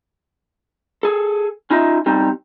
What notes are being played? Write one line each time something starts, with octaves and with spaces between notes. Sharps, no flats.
G#4 A4
C#4 D#4 F4 D#5 E5
G3 C4 D#4